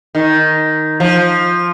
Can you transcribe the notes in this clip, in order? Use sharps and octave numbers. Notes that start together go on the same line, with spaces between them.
D#3
F3